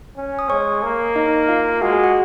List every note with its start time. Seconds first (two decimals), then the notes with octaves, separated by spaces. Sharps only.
0.17 C#4
0.39 D#6
0.50 G#3 C#5 C#6
0.83 A#3
1.16 D#4 D#5
1.48 F4 F5
1.82 G#3 F#4 F#5
1.93 G#4 G#5
2.04 F#4 F#5